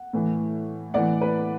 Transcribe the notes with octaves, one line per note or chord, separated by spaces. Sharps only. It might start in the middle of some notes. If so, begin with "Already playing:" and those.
Already playing: F#5
A2 E3
A2 E3 D5 F#5
B4